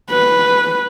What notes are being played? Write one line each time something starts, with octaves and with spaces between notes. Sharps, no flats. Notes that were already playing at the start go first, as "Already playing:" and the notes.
B4